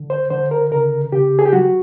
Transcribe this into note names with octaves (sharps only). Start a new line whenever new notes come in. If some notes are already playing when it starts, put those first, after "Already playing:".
Already playing: D3
C5
D3 C5
A#4
C#3 A#4
C#3 G4
G#4
G4
F#3 F#4